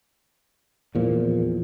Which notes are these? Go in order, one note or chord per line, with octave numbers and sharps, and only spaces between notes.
E2 A#2 F3